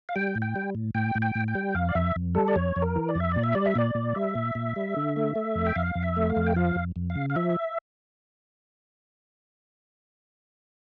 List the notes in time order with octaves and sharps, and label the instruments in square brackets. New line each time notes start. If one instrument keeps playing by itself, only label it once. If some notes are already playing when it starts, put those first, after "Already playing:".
[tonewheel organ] F5
G3 G5
A2
G5
G3
A2
A2 G5
A2
G5
A2
G5
G3
F2 F5
D5
F2 E5
F2
G3 A4
D5
F2 C#5
F2
A#4
E3
D5
F2 E5
A#2 D5
E5
G3 D5
E5
A#2 D5
A#2
G3 E5
A#2
A#2
G3
D3
A3
A3
F2
G5
F2 F5
F2
E5
A3
F5
F2
G5
F3 F5
F2
F2
F5
C#3
F5
F3 E5